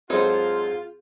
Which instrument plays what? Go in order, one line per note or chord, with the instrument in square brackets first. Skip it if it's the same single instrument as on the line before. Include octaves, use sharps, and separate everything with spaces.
[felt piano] G#2 F#3 C4 [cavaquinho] D#4 A4 C5 [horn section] F4 [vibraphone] G#4